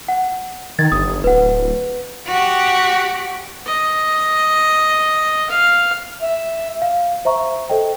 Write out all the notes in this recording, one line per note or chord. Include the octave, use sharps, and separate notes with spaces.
F#5
D#3 G#6 A6
G1 D#6
D1 B4 F#5
F#4 G4
D#5
F5
E5
F5
C5 E5 A#5 C#6
A4 C5 D#5 G5